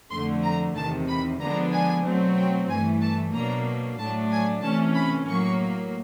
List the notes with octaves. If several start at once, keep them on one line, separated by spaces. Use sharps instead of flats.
F2 D3 F3 A3 C6
A#5
E2 C3 D#3 A5
B5
D3 F3 G#3 B3 D4 A#5
G#5
B2 F#3 A3 C4
G5
G2 E3 A3 G#5
A5
B2 F#3 A#3 D4 A#5
A2 F#3 A3 D4 A5
G#5
C3 E3 A3 C#4 A5
B5
A2 F#3 A#3 C#6